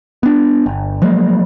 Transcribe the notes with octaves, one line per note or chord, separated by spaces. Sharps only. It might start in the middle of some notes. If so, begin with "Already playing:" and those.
B3 D4
G1
F3 F#3 G#3 A#3